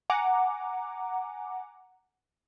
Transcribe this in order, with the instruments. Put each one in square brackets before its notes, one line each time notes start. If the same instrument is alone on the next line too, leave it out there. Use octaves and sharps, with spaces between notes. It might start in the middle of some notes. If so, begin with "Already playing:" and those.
[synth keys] F#5 G#5 A#5 D6